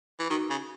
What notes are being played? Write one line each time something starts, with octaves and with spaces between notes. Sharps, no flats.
E3
D#3 D#4 F#4
C#3